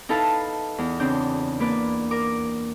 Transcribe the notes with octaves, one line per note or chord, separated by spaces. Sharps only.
D#4 E4 A4 B4 F5 A5
E2
C#3 C4 D4 G6
A#3 B4 D5
A#4 D6